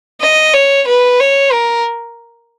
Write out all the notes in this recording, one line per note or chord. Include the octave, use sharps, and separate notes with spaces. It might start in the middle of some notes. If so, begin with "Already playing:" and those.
D#5
C#5
B4
C#5
A#4